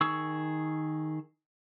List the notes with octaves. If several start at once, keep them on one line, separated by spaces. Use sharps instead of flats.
D#3 G#4 C#6 E6